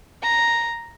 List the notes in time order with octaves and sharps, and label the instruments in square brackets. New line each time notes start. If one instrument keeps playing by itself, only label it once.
[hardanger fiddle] A#5